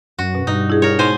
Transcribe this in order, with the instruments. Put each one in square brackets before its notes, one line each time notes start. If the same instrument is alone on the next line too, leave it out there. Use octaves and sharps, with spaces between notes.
[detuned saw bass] F#2 [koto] F#4
[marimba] B2
[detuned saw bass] G2 [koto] D#4
[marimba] E4 G#4
[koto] A#4 C#5
[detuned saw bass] G#2 [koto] B2 C5 G#5